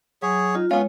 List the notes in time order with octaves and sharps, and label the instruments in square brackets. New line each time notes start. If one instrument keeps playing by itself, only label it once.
[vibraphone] F#3 [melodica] G#4 C#5
[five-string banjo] D#4 [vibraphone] F4
[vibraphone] G#3 C#5 [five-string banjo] B3 F4 [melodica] C#4